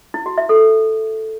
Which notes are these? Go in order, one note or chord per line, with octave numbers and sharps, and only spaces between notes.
E4
F#4
E5
A4